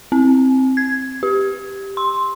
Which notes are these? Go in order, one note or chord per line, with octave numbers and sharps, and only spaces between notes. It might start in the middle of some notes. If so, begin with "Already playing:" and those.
C4
G#6
G4
C6